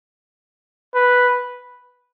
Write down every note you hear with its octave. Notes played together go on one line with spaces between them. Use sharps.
B4